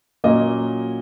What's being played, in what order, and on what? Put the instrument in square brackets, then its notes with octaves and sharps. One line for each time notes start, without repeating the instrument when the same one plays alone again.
[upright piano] A#2 F#3 A#3 C#4 D#5